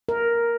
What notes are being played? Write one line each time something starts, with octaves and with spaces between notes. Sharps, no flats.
A#4